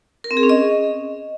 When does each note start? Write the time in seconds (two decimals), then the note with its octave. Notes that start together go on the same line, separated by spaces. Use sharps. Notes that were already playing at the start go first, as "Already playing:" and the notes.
0.24 A#4
0.31 C4
0.37 G#4
0.43 C#4
0.49 D#5